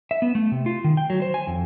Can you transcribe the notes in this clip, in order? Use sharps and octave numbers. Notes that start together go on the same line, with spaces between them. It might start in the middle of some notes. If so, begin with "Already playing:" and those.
E5
B3
A3
C3
F4
D#3
G5
F#3
C5
G#5
F2